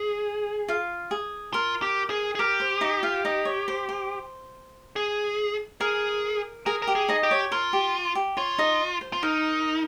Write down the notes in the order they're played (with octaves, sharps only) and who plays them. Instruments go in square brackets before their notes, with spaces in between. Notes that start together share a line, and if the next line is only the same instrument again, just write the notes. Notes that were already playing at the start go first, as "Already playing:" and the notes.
Already playing: [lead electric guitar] G#4
[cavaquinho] F4 F5
G#4
[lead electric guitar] F4 [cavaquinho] A#4
[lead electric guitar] G4
G#4
G#4
[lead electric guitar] G4 [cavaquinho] A#4
[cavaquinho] C5
D#4 D#5
F4 F5
D#4 D#5
C#5
C5
C5
[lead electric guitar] G#4
[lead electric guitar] G#4 [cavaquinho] A#4
[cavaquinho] G#4 [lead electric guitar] A#4
[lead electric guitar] A#4
[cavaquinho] G4
[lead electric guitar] G#4
[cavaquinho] D#4 D#5
[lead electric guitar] G4
[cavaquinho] C#5
[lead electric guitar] F4 [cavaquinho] A#4
[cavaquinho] G4
G4
[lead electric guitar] F4 [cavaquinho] C#5
[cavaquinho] D#4 D#5
C5
[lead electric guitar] F4
[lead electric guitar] D#4 [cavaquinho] A#4